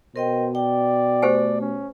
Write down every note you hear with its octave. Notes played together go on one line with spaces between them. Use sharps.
B2 A#4 C5 D#5 G5
D5 G5
A3 G4 C5 G#5
C#4